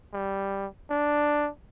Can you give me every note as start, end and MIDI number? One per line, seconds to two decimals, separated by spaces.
0.13 0.67 55
0.90 1.50 62